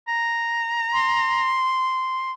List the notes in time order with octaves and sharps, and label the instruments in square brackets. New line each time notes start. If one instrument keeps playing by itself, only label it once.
[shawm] A#5
[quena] C6